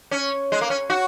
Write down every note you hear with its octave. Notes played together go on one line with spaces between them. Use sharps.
C#4
G#3
A#3
C#4
F#4